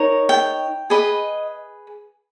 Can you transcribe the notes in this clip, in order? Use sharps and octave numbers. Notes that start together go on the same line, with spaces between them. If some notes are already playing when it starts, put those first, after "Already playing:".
Already playing: D#4 A#4 C#5
G5
G#4 B4 D#5